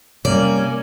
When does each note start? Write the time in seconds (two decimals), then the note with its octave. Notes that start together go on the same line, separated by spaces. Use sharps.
0.25 C3 G3 A#3 C#4 D5